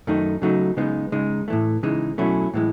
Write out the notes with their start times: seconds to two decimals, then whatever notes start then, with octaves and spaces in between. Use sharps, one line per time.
0.07 F#2 D#3 A3 D#4
0.42 C#3 F#3 A3 D#4
0.77 C#3 G#3 B3 D#4
1.12 C#3 G#3 D#4
1.48 A2 E3 A3
1.83 C#3 E3 G#3 D#4
2.18 B2 F#3 A3 C#4 E4
2.54 A2 E3 G#3